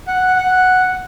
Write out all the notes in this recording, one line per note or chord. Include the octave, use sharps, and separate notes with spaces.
F#5
F#5